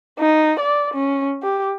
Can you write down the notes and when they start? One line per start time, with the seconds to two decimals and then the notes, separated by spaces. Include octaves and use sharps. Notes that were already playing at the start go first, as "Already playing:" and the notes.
0.19 D#4
0.60 D5
0.94 C#4
1.43 G4